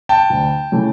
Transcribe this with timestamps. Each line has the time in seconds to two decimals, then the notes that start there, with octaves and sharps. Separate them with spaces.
0.09 G5 A5
0.30 D2
0.72 C#3 E3 A3